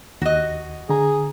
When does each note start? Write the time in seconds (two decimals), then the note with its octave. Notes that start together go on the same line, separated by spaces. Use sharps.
0.22 D#2 F#4 D#5
0.89 D3 G#4 A#5